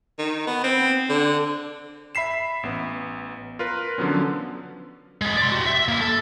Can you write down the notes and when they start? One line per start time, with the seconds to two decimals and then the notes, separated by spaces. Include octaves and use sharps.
0.18 D#3
0.47 B3
0.64 C4
1.09 D3
2.15 E5 B5 B6 C7 E7
2.63 A1 B3
3.59 F4 A#4 B4
3.98 D3 F3 F#3 B3 C#4
5.22 G#3 B3
5.37 D5 C6
5.52 F#4 G4
5.66 E5
5.88 A#3 E4
6.01 A4